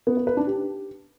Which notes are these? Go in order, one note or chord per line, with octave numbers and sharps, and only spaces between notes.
B3
B4
B4
D4
G4